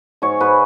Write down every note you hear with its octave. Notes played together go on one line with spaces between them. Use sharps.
G#2 C#5
G#2 B4